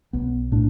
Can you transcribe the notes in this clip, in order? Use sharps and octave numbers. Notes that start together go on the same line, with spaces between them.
B1 B3
A2 D4